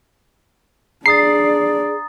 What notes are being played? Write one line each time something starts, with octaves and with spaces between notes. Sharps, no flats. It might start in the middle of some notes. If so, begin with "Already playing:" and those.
D4 G#4 D5 A#5 D#6 A6 C7